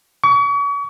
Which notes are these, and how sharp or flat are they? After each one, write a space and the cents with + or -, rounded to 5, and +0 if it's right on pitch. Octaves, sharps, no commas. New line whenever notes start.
C#6 +40